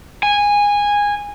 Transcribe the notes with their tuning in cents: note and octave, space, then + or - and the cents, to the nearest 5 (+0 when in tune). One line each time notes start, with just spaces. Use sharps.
G#5 -15